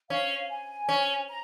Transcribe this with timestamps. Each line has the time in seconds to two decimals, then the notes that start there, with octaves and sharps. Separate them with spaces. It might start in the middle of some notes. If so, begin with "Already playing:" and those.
0.10 C#4 F5
0.49 G#5
0.89 C#4
1.29 A#5